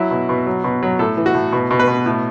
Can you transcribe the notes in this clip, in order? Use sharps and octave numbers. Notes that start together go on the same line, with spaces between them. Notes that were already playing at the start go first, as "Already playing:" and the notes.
Already playing: F#3 E4
B2
B2
F#3
B2
F#3
A2 A4
E3
F#4
A2
B2
B2
B4
B2
A2